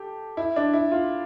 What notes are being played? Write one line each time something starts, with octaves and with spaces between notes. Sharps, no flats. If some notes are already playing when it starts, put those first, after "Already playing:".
Already playing: G4 A4
E4
D4
E4
F4